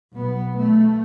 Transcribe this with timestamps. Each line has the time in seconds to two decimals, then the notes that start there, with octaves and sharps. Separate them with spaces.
0.13 B1 B3
0.57 A3